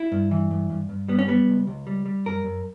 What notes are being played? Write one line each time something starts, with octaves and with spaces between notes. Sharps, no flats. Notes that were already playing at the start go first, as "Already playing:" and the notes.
Already playing: E4
G2
E3
G2
G2
G2
G3 B3
C#4
G3 B3
C#2
C#2
G3
G3
F#2 A#4
F#2